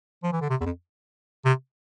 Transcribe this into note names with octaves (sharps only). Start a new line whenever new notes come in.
F3
E3
D3
C3
E2
F2
C3